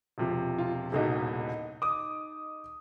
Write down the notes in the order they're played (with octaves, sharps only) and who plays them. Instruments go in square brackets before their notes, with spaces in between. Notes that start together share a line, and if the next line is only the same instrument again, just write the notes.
[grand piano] E1 C3 F3
[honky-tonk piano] F4
[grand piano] D#1 C2 B2 [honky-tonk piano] D#4 G#4 A4
[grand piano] D6 D#6